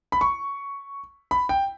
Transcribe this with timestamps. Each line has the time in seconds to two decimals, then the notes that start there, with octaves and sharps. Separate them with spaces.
0.12 B5
0.21 C#6
1.31 B5
1.49 G5